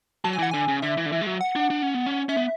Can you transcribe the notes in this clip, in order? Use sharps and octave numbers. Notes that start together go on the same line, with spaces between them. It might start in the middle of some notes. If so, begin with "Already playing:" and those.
F#3 A5
G#5
E3 F#5
D3 G#5
C#3
D3 E5
E3
D3
E3
G#3
F#3
F#5
D4
D4
C#4
B3
C#4
C#4 E5
B3